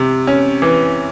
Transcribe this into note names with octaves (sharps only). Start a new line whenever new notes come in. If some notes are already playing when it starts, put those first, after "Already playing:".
Already playing: C3
C#4
E3